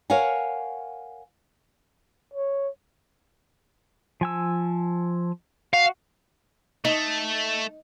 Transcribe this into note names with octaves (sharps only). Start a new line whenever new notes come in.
A#4 C#5 F5 F#5 G#5
C#5
F3 G#5 E6
F#4 F5
A3 D#4